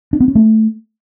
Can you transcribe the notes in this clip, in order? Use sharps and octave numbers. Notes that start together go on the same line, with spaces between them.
D4
B3
C#4
A3